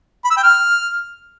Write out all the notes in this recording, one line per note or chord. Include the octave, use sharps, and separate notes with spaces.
B5
E6
G5
F6